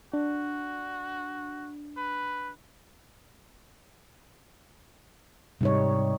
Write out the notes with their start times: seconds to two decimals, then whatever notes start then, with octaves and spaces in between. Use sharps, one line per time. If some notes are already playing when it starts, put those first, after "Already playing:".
0.14 D4 F#4
1.97 B4
5.61 G#2 C3 G3 D#4 C#5